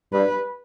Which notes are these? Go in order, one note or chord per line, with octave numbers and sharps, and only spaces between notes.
G2 B4